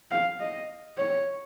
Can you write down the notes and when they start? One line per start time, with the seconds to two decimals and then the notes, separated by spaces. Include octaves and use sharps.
0.11 F5
0.40 D#5
0.98 C#5